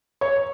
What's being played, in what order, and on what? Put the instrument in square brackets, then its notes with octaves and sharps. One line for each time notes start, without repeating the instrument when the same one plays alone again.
[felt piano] C#5